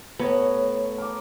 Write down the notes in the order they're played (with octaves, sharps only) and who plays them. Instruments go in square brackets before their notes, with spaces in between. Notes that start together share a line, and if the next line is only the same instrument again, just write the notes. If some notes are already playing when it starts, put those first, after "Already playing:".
[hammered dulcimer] A2 C#5 A#5 [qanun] B3
[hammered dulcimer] A#4 D6